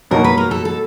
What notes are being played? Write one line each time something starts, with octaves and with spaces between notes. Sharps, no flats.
B2 F#3 A#3 D#4 F#4 A#4
B4
A#4
A4
A4